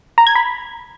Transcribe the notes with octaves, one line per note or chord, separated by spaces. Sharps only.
A#5
G#6
B5